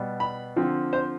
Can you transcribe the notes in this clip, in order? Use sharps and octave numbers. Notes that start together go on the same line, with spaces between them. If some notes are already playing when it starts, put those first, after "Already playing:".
Already playing: B2 G3 B3
B5
D3 F3 C4
C5